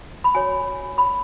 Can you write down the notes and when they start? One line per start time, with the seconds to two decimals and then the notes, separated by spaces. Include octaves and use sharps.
0.24 B5
0.35 F#4 C#5 G#5
0.98 B5